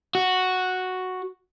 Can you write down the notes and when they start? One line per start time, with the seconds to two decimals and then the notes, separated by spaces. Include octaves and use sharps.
0.15 F#4